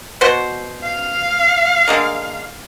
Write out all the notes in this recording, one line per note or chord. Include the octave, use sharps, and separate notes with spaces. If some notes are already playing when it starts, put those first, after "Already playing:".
B2 F#4 C5
F5
D3 G#3 A#3